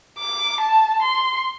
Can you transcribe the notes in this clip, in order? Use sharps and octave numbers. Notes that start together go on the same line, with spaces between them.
D6
A5
C6